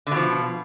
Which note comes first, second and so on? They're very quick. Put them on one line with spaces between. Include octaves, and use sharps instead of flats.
D3 B2 F3